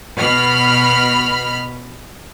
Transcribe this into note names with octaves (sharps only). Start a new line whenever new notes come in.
B2 B5 F6